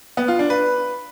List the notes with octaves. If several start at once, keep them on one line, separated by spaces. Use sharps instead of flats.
B3
F4
D4
B4